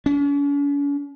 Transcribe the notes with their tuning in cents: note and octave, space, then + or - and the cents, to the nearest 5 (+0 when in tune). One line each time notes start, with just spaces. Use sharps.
C#4 +45